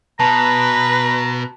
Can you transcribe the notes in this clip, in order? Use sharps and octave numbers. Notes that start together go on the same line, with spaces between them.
B2 B4 A5 A#5